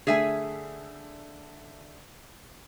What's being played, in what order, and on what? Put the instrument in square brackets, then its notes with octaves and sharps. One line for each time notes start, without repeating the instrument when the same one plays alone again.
[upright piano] D3 A3 [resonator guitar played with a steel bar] G#4 E5 G#5